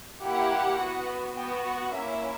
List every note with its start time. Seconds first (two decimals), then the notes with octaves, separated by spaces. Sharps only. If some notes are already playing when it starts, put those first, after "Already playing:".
0.22 A#3 E4 G4 F#5
0.80 B3 F#4
1.37 B3 F#4 G5
1.66 F#5
1.94 A#3 C#4 E4 E5